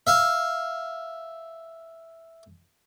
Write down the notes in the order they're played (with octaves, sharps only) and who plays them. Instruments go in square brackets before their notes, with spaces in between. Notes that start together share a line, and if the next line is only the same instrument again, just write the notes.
[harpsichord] E5 F5